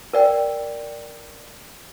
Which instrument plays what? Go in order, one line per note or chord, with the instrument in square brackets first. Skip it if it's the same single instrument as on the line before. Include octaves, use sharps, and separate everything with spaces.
[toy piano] A#4 D5 G5